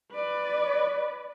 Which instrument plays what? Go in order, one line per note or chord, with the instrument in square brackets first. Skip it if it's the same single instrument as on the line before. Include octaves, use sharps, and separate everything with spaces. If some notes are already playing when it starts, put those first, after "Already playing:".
[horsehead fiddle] B4 D5